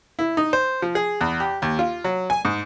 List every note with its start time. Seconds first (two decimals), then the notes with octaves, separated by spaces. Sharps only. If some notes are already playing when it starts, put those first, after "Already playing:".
0.19 E4
0.37 D#4
0.53 C5
0.82 F3
0.95 G#4
1.21 E2
1.40 G4
1.62 D#2
1.79 F4
2.04 F#3
2.30 G#5
2.45 G#2